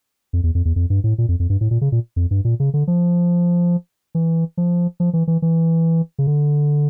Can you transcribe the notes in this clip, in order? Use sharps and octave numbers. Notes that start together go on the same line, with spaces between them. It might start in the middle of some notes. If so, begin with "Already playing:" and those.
F2
E2
F2
E2
F2
G2
A2
A#2
F2
F2
G2
A2
A#2
C#3
A#2
F2
G2
A#2
C#3
D3
F3
E3
F3
F3
E3
E3
E3
C#3
D3